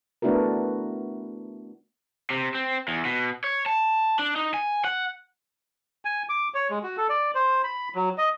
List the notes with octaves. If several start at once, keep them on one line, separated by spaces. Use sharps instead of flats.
A3 B3 D4 E4 F#4 A#4
C3
C4
E2
B2
C#5
A5
D4
D#4
G#5
F#5
G#5
D6
C#5
G#3
F#4
A4
D5
C5
B5
F#3
D#5